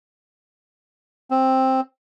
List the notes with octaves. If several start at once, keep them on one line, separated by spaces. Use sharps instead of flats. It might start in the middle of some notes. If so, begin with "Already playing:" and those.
C4